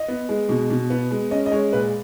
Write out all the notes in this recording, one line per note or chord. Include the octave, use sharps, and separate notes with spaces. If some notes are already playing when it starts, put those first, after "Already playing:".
Already playing: D#5
B3
G#3
B2
B2
B3
G#3
C#4 D#5
D#5
G#3 C#5
A#2 B4